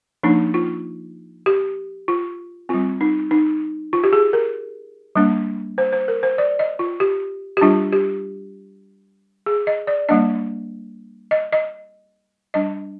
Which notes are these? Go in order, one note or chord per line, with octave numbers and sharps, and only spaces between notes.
F3 A#3 D4 D#4
F4
G4
F4
G3 C4 F4
D#4
D#4
F4
G4
G#4
A#4
G3 A#3 D4
C5
C5
A#4
C5
D5
D#5
F4
G4
G4
G3 D4 F4
G4
G#4
D#5
D5
G3 A#3 D4 D#5
D#5
D#5
G3 D4 D#5